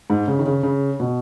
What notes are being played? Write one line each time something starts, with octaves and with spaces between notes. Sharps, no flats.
G#2
C#3
D#3
C#3
C#3
B2